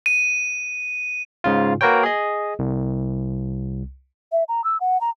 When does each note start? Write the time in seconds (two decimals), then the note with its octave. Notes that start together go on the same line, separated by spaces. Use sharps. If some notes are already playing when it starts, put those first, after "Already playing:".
0.06 D#7
1.44 G#2 C#3 F4
1.81 A#3 F#4 A#4 B4 C#5 G5
2.03 G#4 D#5
2.59 C2
4.32 E5
4.49 A#5
4.64 E6
4.81 F#5
5.01 A#5